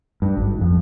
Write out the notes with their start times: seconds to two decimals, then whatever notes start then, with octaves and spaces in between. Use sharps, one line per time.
0.22 G2
0.37 G#1
0.61 F2